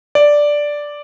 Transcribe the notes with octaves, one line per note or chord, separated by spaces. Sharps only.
D5